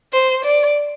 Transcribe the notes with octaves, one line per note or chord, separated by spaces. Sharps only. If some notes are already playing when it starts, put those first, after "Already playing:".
C5
D5